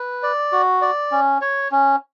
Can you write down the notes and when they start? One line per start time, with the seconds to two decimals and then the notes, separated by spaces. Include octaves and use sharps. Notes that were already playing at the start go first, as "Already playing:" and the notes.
Already playing: B4
0.23 D5
0.52 F#4
0.82 D5
1.11 C#4
1.41 C#5
1.71 C#4